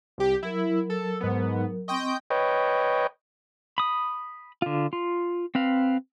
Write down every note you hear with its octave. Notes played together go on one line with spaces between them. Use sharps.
C2 G4
F#3 E4 A#4
A4
G#2 B3
C4 D#5 G5 C6 C#6 G6
B4 C#5 D#5 G5
B5 D#6
D3 F4
F4
C4 B4 F5